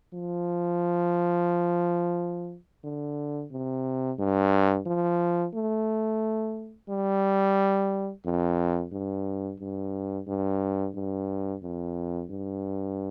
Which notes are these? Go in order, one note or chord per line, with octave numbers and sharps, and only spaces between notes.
F3
D3
C3
G2
F3
A3
G3
F2
G2
G2
G2
G2
F2
G2